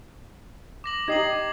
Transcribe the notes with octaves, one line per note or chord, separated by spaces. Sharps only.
D6 A#6 F#7
D#4 G4 D#5 G#6 C7 F#7